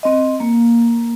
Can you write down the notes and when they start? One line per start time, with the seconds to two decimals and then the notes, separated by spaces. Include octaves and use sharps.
0.03 C4 D#5
0.40 A#3